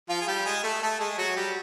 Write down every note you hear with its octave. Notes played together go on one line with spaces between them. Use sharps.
F3 F4
G#4
G3 G4
G#3 G#4
A3 A4
A3 A4
G#3 G#4
F#3 F#4
G3 G4